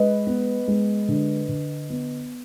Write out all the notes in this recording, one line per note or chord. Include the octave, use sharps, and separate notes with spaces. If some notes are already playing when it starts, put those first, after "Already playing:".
Already playing: G#3 B4 D#5
B3
G#3
D3
D3
B3